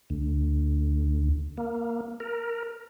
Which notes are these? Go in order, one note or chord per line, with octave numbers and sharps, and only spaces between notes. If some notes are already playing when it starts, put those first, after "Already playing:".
D2
A#3
A#4